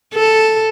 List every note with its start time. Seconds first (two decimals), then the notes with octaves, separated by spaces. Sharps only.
0.14 A4